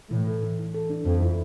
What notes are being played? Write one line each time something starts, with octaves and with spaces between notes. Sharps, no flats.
A2 E3
A4
E3
E3
A4
D4
F2 F3
E4